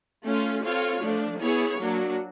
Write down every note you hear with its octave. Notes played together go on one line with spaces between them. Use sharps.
A3 C#4 F4
C4 F4 A4 C#5
F3 A3 D4
B3 E4 G#4 C#5
F#3 A#3 D4 F#4